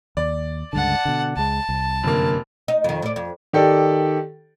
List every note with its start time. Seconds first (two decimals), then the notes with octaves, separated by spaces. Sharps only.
0.17 D#2 D5
0.73 C#2 G2 D3 F#5 A5
1.05 B2 D3
1.37 C#2 G#3 A5
1.69 C2
2.04 F1 F#2 D3 A#3
2.68 D#4
2.84 F2 D#3
3.02 A2 D5
3.16 F2
3.53 D#3 G4 A4 D5